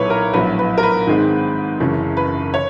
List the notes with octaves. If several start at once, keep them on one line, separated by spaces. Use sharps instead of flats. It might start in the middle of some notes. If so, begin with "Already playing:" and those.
Already playing: B1 A#2 F#3 B3 E4 B4 C#5
A#4
A#1 A2 F#3 B3 B4
B4
A#4
B4
G#2 D#3 G#3 C4
F#1 F#2 C#3 E3
B4
C#5